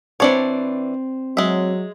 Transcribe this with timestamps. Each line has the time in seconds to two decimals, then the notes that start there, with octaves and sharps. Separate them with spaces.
0.20 E3 C4 D4 C#5 D5
1.37 F#3 G#3 E5